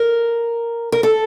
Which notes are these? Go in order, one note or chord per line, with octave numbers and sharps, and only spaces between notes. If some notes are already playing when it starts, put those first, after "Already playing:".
Already playing: A#4
A#4
A4